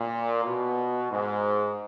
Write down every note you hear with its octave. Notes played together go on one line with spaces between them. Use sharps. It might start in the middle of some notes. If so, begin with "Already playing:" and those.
Already playing: A#2
B2
G#2